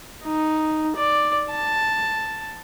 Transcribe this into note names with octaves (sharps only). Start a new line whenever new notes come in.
D#4
D5
A5